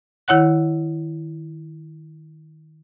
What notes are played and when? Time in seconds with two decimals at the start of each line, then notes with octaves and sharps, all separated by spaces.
0.28 D#3 E4 C#5 F#5 F#6